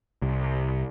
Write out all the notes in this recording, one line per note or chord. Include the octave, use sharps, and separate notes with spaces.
C2